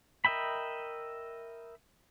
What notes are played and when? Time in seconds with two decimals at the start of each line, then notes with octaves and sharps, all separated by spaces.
0.25 A#4 D#5 E5 G5 B5